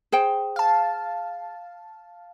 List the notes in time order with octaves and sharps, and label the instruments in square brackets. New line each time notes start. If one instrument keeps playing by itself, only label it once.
[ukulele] G#4 C5 G5
[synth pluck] F5 A5